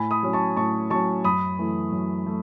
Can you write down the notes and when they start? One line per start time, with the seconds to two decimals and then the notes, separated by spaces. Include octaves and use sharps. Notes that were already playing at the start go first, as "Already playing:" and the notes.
Already playing: A2 G#5 B5
0.11 B5 D#6
0.23 F#3 C#4
0.33 A5 C#6
0.56 A2 A5 C#6
0.90 F#3 C#4 A5 C#6
1.24 F#2 B5 D#6
1.59 E3 A3
1.92 F#2
2.26 A3